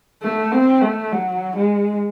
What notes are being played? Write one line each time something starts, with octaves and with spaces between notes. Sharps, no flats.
A3
C4
A3
F#3
G#3